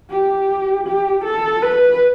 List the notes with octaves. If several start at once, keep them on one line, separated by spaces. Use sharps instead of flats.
G4
G4
A4
B4